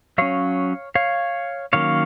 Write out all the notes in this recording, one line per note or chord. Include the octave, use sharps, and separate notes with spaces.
F#3 C#4 C#5 F5
C#5 F5
D#3 F#3 A#3 C#4 C#5 F5